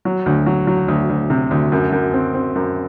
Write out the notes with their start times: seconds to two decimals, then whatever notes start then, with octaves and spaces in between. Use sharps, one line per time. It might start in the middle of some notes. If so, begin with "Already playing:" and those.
0.05 F#3
0.26 D2
0.46 F#3
0.67 F#3
0.88 D2
1.09 D2
1.30 C3
1.51 D2
1.72 F#2
1.92 F#2
2.13 C4
2.34 C4
2.55 F#2